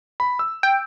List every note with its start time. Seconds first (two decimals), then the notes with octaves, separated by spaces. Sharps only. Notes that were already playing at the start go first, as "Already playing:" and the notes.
0.20 B5
0.39 E6
0.63 G5